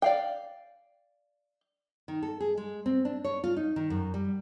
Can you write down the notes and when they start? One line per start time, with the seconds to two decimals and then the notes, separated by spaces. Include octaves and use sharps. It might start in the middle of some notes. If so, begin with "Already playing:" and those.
0.02 D5 F5 G5
2.08 D#3
2.23 A4
2.40 G#4
2.57 G#3
2.86 C4
3.05 D4
3.24 C#5
3.44 F4
3.57 D#4
3.76 D#3
3.90 F#2
4.14 G3